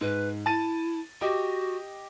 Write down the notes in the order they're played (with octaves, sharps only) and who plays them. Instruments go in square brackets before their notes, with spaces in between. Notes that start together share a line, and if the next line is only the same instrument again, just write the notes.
[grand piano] G#2 [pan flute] B4
[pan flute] E4 [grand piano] A5 A6 D#7
[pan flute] F#4 [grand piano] G4 D#5 D6